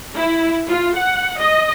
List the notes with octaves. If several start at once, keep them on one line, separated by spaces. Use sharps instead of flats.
E4
F4
F#5
D#5